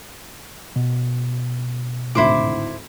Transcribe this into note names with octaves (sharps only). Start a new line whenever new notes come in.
B2
G#1 D2 A2 E4 C5 D6